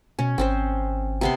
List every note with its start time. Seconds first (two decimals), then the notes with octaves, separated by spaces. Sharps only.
0.19 B2 C#4
0.38 G#1 C4 C#4 C5
1.21 C3 B3 C6